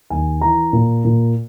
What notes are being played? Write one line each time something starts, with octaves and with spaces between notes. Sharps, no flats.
D#2 G#5
E3 A#5
A#2
A#2